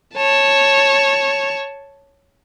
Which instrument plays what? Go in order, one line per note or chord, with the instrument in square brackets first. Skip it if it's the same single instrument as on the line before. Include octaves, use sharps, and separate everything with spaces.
[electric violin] C#5 A5